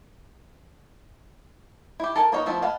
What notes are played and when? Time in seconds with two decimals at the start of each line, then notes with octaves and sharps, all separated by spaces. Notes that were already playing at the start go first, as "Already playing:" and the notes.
2.00 E4 G4
2.16 A4 A#4 G#5 A5
2.32 A#3 B3 D#4 C#5 D#5
2.46 F3 A3 B3 C4 E4
2.62 D#5 F5 F#5 A5 B5